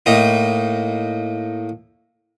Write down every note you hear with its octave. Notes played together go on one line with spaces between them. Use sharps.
A2 A#3 D#4